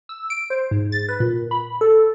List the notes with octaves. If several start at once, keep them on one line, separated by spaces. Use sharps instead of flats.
E6
D7
C5
G#2
A6
B4
A#2
B5
A4